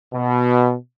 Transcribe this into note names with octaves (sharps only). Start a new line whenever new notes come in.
B2